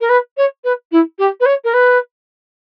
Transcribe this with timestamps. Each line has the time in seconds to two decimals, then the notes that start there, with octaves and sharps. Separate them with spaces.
0.01 A#4
0.09 B4
0.37 C#5
0.64 B4
0.92 E4
1.19 G4
1.40 B4
1.46 C#5
1.64 A#4
1.74 B4